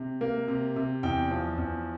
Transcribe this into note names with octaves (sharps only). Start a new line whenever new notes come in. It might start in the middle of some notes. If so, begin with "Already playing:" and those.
Already playing: C3
A#3
C3
C3
E2 G5
F3
E2